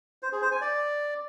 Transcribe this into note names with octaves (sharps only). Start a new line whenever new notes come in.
C5
G#4
C5
G#5
D5